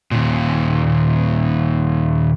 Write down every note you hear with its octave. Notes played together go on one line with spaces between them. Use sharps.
D#2 A#2